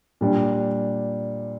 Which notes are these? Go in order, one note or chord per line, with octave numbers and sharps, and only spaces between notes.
A#2 G3 D4